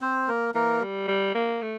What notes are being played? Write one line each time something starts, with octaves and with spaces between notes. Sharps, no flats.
C4 C5
A#3 A#4
E3 A#3 A#4
G3
G3
A#3
A3